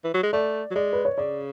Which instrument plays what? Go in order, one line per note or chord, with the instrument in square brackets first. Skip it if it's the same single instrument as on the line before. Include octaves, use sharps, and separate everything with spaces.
[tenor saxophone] E3
F#3
G#3
[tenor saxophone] A3 [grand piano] D5
[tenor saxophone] F#3
[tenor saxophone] G#3 [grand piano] D5
[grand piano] B4
C#5
[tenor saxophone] C#3 [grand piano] D5